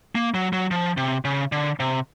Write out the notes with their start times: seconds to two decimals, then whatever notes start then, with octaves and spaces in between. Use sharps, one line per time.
0.15 A#3
0.34 F#3
0.53 F#3
0.71 F3
0.97 C3
1.25 C#3
1.52 D3
1.80 C3